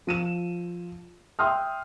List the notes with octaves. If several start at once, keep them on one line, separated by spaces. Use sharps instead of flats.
F3 D#7 E7
E5 G5 C6 D#6 F6